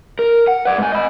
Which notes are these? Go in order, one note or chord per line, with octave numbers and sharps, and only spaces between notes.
A#4
F#5
B4 D5
G#2 G#5
D#5 B5